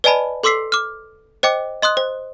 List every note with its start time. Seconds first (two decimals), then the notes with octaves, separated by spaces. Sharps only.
0.04 B4 D5 D#5 G#5 A5 B5
0.43 A4 C6 D6 E6 B6 C7
0.72 D6 F6
1.43 C5 D#5 G5 D6
1.82 D#5 C6 D#6 F#6
1.97 C5